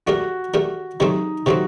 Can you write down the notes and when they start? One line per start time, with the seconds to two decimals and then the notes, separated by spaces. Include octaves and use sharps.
0.06 A3 D4 F#4 G4 A#4
0.54 A3 D4 G4 A#4
1.00 C3 D#3 F#3 A3 C4 D#4
1.46 C3 D#3 F#3 A3 C4 F#4